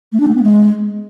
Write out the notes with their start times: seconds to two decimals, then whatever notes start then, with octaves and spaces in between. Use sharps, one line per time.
0.13 A3
0.20 D4
0.28 A3
0.35 B3
0.43 G#3